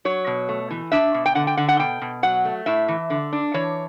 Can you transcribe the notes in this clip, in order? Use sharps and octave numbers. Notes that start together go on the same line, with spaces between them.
F#3 C#5
B2
A3
E3
D4 E5
B2
G5
D3 F#5
G5
D3 F#5
F#5
B2 G5
B2
F#3 F#5
A3
A2 E5
E3
D3
D4
E3 C#5